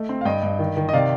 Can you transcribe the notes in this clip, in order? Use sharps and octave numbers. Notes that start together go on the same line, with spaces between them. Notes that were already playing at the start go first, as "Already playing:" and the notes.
Already playing: A3 D#5
C4
F5
G2 D#5 G5
G2
D#3
D#3
D#5
C3 D5 F5